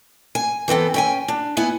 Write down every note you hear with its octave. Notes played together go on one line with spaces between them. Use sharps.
G#5
E3 B3 C4 A4
C#4 G5 G#5
D4
B3 E4 F#5 G#5